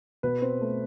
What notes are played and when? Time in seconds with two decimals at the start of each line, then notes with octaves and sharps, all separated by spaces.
0.23 B2 B4
0.42 C4
0.61 A3